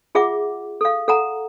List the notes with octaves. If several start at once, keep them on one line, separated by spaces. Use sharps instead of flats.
F4 G#4 E5 F#5 D6
A4 F5
A4 F#5 A#5